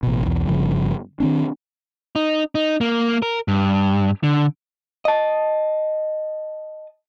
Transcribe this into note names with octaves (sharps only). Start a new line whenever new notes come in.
A1 B2
B1 E2
G1 G2 C#3 F3
D#3 C4 D4
D#4
D#4
A#3
A#4
G2
D3
D#5 A5